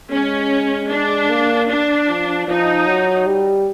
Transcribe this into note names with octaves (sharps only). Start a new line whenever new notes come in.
G#3 C#4
D4
A#3
D4
F3
F3 D#4
F#3
G3